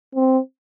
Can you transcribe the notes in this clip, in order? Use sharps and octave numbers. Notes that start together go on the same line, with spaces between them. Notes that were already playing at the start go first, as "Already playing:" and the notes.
C4